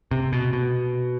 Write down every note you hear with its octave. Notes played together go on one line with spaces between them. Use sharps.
C3
B2
B2